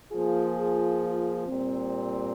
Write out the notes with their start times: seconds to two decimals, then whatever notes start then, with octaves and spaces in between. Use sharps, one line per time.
0.12 F3 A#3 F4 G#4
1.47 A#2 G3 C4